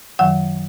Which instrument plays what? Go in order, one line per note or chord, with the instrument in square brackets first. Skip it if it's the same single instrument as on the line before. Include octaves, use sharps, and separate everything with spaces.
[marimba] F#2 D#3 F#3 F#5